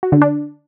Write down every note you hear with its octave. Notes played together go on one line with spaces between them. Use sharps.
F#4
D3
D4